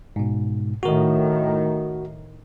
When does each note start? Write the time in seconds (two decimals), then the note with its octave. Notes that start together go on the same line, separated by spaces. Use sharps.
0.16 G#2 B2
0.83 A2 D#3 F#4 A#4